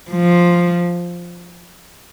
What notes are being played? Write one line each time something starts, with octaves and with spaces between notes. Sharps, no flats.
F3